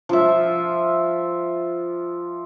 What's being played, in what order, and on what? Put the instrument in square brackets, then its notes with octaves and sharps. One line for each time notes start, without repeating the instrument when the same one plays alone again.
[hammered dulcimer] F3 E5